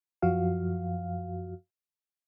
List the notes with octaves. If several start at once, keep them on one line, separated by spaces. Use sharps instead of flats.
F#2 F3 F#4 F5